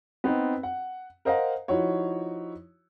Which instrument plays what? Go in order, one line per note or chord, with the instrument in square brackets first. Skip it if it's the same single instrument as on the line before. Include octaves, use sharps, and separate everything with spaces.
[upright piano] B3 C4 D#4
F#5
A#4 C5 D#5 F5 F#5 A#5
F3 D#4 E4 F#4 C#5